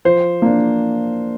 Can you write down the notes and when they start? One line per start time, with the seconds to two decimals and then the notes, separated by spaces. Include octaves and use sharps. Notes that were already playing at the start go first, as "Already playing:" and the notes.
0.05 F3 C5
0.42 A#3 D4